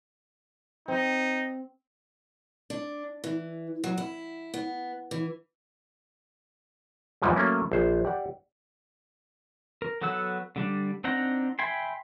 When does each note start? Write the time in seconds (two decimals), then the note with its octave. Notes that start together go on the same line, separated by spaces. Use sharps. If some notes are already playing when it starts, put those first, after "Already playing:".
0.88 C4 D#4
2.70 D4
3.24 E3
3.84 F#3
3.98 E4
4.54 B3
5.11 E3
7.22 E2 G#2 E3 F3 G3
7.36 F#3 A3 A#3 C#4 E4
7.72 A#1 C5
8.05 G4 D5 F#5
9.82 A#4
10.02 F#3 B3 A4 F#5 E6
10.56 D3 G3 D4
11.04 C4 D4 D#4 F#5 A#5
11.59 E5 G5 G#5 B5 C6